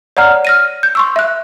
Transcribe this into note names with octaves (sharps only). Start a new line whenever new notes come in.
C#5 D5 F#5 A#5 F6
F6 A#6 D#7
G6
C6 C#6 E6
E5 F#6